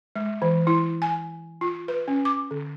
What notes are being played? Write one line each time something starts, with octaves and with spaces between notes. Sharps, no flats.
G#3
E3
E4
G#5
F4
B4
C#4
D6
D3